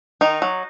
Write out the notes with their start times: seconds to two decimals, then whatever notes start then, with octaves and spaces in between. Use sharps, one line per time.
0.21 D#3 D#4
0.42 F#3